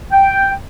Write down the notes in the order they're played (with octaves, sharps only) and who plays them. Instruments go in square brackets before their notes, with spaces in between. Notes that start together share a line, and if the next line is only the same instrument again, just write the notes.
[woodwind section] G5